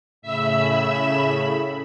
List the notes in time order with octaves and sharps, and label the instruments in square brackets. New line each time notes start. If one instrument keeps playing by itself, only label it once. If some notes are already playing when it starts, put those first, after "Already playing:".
[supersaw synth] A2 C#3 B5 [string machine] E5 E6